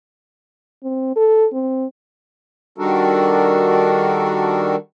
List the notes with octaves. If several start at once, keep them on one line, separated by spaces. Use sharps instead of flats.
C4
A4
C4
D#3 G3 D4 F#4 A4 A#4